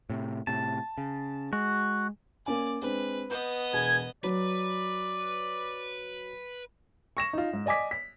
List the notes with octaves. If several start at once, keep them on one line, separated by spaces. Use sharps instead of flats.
A2 C3
A2 C3 A5
C#3
G#3 F#4
A#3 C#4 D5 G#5
G#3 C4 D4 B4
B3 B4 D#5 G6
E1 G#4 G#6
F#3 B4 D5
C#6 A#6 E7
D#4 F4
G#2
D5 D#5 G#5 D6 B6
B6